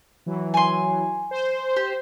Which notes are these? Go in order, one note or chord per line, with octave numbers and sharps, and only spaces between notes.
E3 F#3
G#5 C6
C5
G4